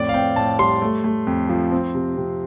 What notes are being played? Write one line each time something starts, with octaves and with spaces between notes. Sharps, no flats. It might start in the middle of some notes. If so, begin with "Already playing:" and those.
Already playing: F2 A2 D5
F5
C4 G5
A2 A5
G3 C6
A3
A3
F2
F3
C4
C3
C3